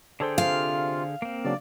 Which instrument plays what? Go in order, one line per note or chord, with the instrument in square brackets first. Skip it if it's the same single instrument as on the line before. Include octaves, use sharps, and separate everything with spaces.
[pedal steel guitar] D3 G#4 G5 [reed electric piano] D4 A4 C5
[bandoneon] C3 F4 [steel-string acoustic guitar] F5
[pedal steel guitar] A#3 C4
[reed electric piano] C#3 F#3 D4 [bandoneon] D5